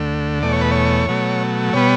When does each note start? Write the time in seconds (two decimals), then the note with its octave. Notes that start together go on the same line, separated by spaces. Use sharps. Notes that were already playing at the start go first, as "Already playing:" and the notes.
Already playing: D2 D3 A3
0.43 E2 B2 A3 D5
0.53 C#5
0.61 B4
0.71 C#5
1.09 B2 F#3 A3
1.73 B2 G3 B3 C#5